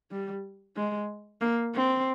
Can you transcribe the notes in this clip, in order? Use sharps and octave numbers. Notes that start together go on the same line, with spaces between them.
G3
G#3
A#3
C4